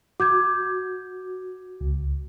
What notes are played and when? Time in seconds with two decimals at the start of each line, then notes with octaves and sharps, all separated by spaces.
0.20 F#4 D6 G6 G#6
1.81 C#2